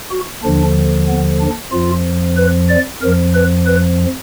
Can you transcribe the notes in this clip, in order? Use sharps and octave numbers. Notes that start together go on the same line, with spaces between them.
F#4
D#2 D3 F3 D4
B3
D4
F2 F3 F4
B4
D5
F2 F3 A#4
B4
B4